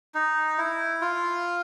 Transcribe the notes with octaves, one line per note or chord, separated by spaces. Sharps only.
D#4
E4
F4